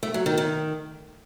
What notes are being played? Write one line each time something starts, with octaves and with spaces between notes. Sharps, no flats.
A3
F#3
D#3
D#3